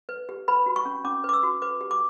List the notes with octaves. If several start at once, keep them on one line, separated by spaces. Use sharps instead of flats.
B4
G4
B4 B5
F#4
C#6
C#4
C#4 D6
B4
D6
E6
F#4
B4 D6
G4
D6